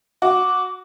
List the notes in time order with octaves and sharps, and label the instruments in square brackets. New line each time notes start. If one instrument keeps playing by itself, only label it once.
[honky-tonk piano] F#4 [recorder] D6